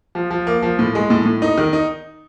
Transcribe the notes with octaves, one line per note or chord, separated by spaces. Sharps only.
F3
F3
A#3
F3
A2
G#3
A2
A2
D#4
D#3
D#4